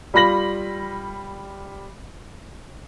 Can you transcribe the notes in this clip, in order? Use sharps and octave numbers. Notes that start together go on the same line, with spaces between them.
G3 F4 B5 A#6 F#7